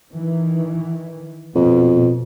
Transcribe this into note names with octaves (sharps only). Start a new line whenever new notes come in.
D#3 E3
F2 B2